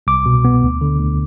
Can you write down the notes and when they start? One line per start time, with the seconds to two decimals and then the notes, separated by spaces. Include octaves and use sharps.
0.07 C2 D6
0.26 B2
0.45 B3
0.62 D2
0.81 D3
0.99 D2